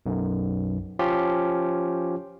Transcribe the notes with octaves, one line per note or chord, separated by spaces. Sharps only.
B1 F#2
F3 C#4 F4 G4